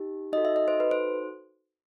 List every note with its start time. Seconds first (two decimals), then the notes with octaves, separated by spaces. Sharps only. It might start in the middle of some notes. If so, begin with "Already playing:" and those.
Already playing: D#4 G4
0.32 D#4 F#4 A4 D#5
0.45 E5
0.56 D#5
0.68 C5
0.80 B4
0.91 C5